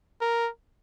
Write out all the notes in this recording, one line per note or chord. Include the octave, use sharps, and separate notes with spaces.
A#4